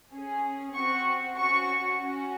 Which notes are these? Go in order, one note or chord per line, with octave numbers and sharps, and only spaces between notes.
C#4 G#4
C4 F#4 C#6
C#4 F#4 C#6
C#4 F#4